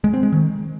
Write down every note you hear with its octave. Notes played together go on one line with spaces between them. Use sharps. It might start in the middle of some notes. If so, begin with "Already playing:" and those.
G#3
C4
G#3
D#3